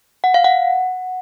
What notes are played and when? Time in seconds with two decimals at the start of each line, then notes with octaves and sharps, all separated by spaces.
0.24 F#5
0.34 F5
0.44 F#5